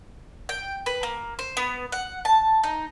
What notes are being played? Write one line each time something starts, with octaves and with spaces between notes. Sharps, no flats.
G5
B4
A#3
C5
B3
F#5
A5
D#4